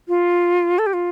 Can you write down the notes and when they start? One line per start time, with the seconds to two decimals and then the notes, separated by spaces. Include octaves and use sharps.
0.08 F4
0.79 A4
0.86 G4
0.93 F4